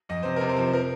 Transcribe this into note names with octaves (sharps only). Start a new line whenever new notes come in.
F2 D#5
C3 C5
C3 A#4
C5
F3
A#4